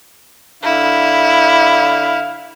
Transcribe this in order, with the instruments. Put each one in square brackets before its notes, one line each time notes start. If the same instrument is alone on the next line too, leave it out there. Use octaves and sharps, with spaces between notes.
[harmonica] D3 F5 [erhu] E4